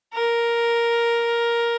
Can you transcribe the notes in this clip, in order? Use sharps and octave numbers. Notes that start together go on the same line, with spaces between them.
A#4